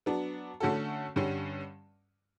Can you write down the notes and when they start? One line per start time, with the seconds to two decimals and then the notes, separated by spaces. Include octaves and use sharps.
0.06 F#3 B3 D4
0.60 D3 A3 C#4 F#4 A4
1.16 G2 D3 G3 C#4